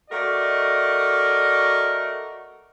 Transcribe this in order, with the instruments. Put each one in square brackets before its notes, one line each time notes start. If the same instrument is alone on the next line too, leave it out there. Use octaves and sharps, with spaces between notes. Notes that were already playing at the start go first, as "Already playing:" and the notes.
[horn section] A3 F#4 A#4 D5 D#5